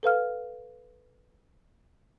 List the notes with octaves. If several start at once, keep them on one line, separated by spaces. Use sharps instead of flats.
A4 B4 F5 F6